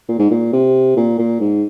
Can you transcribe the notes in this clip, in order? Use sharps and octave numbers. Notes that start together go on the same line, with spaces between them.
A#2
G#2
A#2
C3
A#2
A#2
G#2